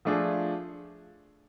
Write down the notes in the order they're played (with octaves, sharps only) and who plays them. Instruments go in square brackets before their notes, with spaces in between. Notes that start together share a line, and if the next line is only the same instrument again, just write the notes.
[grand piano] F3 A3 D4 F4 G#4